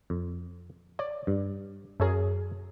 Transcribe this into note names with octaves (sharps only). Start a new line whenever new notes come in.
F2
C#5 D5
G2
F#2 G#4 A#4 C#5 E5